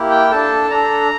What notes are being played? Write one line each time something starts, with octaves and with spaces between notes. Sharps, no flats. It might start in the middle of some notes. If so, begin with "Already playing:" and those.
Already playing: A#3 E4 G4
G5
D4 A4 A5
D4 A4 A#5